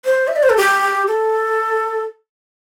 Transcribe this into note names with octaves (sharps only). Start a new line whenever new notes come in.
C5
E5
D5
C5
A4
G4
A4